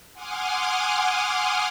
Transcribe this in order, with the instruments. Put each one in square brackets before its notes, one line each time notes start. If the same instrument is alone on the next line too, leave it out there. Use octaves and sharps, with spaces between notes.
[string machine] F#5 G#5 C6 D6 D#6 F6